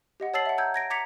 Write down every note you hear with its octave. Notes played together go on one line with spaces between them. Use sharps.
G4 D#5 F#5
C#5 A5 E6 A6 C7 F#7
E5 F#5
A#5 E6 G6 G#6
G#6 A#6 D7
A#5 D6 G#6 B6 C#7 F7